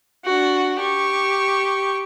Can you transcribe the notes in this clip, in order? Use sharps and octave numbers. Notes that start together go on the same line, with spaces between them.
D4 F#4
G4 C#6